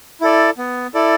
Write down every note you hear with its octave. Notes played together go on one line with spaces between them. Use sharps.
E4 A4 D5
B3
E4 A4 D5